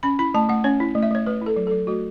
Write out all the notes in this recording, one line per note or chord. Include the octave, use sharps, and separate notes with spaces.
C#4 B5
E4 B5
A3 A5
A3 F#5
C#4 C#5
E4
A3
E5
A3 C#5
A3 B4
E4 A4
F#3
A4
F#3
A3 F#4